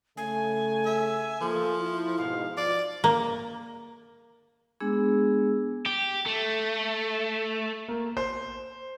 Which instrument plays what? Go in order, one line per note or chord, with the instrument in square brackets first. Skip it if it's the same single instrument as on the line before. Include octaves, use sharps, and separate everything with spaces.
[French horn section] C#3 A3 [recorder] G#5
[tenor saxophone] E5
[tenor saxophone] F3 [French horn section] A#3 A4
[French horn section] E4
[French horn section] G#2 B2 [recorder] F5
[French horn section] F3 [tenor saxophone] D5
[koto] A#3
[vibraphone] G#3 B3 D4 G#4 E6
[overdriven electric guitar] G4
A3
[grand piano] A#3
C5